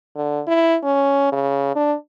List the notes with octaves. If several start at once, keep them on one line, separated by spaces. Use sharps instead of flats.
D3
E4
C#4
C#3
D4